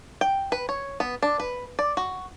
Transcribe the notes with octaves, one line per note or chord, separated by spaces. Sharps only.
G5
B4
C#5
B3
D4
B4
D5
F#4